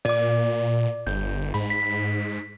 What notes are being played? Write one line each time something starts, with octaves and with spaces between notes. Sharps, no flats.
A#2 D5 D6
G1 G6
G#2 B5
B6